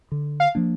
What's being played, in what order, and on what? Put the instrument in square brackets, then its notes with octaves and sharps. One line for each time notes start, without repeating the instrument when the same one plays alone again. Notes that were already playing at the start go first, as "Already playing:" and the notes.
[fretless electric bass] D3
[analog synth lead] F5
[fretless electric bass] F3 A#3 D4